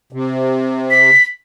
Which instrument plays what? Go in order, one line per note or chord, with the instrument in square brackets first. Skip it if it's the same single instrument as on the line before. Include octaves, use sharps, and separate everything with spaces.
[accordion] C3
[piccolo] B6